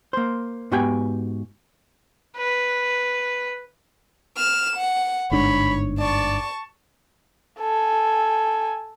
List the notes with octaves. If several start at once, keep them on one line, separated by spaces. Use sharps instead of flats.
A#3 C5
G#2 B3 F#4 G4 G5 G#5
B4
F6 E7
F#5
G1 G#2 D4 C#5 B5
D5 A5 C#6
A4 G#5